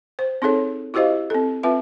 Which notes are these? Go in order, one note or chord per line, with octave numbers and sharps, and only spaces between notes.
C5
C4 D#4 G#4 A4 C#5
E4 F#4 G4 C5 D#5 F5
C4 A4
C4 F4 B4 E5